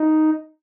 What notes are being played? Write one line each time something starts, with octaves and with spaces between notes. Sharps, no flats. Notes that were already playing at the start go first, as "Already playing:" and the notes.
Already playing: D#4